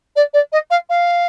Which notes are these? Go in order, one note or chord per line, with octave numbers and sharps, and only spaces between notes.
D5
D5
D#5
F5
F5